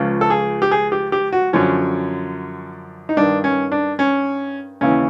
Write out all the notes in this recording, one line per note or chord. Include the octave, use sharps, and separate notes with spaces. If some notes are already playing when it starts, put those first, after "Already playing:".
Already playing: C#2 C#3 F3
A4
G#4
G4
G#4
G4
G4
F#4
F#2 D3 F3 C#4
D#4
G2 D#3 D4
C#4
D4
C#4
D#2 C#3 E3 C#4